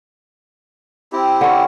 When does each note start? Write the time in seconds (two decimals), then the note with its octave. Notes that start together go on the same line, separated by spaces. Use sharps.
1.12 C4 E4 G4
1.41 D3 C#4